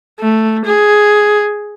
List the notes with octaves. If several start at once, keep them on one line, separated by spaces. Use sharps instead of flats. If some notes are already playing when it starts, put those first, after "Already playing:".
A3
G#4